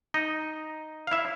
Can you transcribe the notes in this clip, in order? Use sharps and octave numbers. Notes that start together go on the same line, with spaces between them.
D#4 D#5
F5
E4 E5